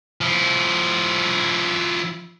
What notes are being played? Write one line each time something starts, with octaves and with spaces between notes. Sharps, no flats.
F3 E4